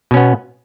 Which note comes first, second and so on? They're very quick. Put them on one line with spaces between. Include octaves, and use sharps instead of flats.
B2 C#4 B3